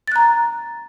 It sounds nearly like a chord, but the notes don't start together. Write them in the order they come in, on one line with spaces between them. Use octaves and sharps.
A6 F#6 A#5